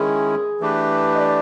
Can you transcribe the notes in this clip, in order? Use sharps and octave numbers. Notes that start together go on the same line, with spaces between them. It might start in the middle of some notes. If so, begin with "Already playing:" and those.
Already playing: D#3 G#3 C#4 E4 G#4
E3 A3 D4 G4 B4
D#5
D5